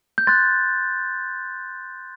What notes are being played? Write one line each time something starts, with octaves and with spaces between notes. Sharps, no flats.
G6
C6 F#6 A6